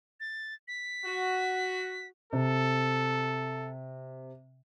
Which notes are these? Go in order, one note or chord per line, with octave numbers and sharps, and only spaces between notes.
A6
B6
F#4
C3 A4